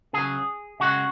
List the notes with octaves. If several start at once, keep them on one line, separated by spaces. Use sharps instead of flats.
C#3 F#3 G#4
C#3 G#3 F#4